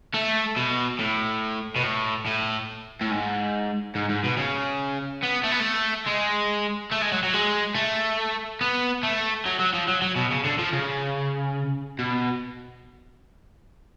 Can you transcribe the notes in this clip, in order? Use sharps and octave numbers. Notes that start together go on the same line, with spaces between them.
A3
B2
A2
B2
A2
A2
A2
G#2
G#2
G#2
B2
C#3
B3
A3
B3
A3
G#3
A3
G#3
F#3
F#3
G#3
A3
B3
A3
F#3
F#3
F3
F#3
F#3
B2
C#3
D3
F3
C#3
B2